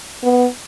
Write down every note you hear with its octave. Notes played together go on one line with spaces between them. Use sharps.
B3